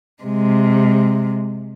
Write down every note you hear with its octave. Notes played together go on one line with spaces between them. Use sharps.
C3 G#3